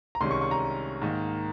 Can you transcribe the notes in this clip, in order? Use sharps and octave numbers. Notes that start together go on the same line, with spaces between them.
A#5
C2 C3 D#3 G#3 C#4 C6
C#6
C#6
A#5
G#2 D#3 A#3